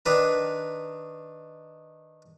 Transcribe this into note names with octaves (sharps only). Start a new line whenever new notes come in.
D#3 D4 B4 A#5